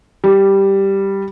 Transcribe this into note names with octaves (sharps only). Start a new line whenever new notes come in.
G3